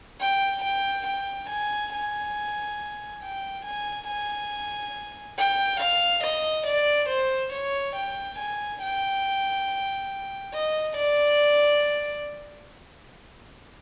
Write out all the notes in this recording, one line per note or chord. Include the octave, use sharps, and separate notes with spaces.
G5
G5
G5
G#5
G#5
G5
G#5
G#5
G5
F5
D#5
D5
C5
C#5
G5
G#5
G5
D#5
D5